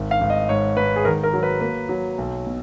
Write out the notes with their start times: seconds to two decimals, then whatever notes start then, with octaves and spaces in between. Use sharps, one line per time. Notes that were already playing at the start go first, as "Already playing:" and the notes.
Already playing: G#1
0.11 F5
0.21 G#1
0.30 D#5
0.49 G#2 C#5
0.77 G#2 B4
0.96 G#4
1.05 D#3 A#4
1.24 A#4
1.34 F#3
1.43 B4
1.61 A#3 B4
1.89 F#3
2.18 B1
2.47 B2